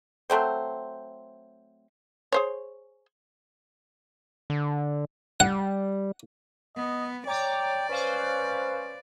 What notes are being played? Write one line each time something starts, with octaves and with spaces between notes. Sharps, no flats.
F#3 A3 C4 C5
G#4 C5 C#5
D3
G3 F#5
B3 D#5
C#5 D5 G5 A#5 D6
C#4 B4 C5 F5